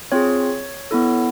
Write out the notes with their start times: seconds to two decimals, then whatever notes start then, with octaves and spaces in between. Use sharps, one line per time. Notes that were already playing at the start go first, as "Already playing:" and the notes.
0.12 C4 F4 G#4 C#5
0.91 B3 E4 A4